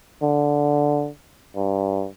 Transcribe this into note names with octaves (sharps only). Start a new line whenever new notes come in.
D3
G2